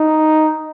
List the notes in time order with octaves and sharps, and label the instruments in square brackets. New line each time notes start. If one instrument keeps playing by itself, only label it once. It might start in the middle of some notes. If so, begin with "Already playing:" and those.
Already playing: [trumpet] D#4